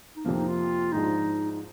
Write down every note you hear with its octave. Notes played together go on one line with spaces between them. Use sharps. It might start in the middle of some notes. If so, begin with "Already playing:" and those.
D#4
F2 C3 F3 A#3 D4
D#4
F4
G#2 F3 G#3 D4 D#4
D#4